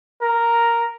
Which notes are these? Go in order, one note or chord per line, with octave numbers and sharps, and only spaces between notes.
A#4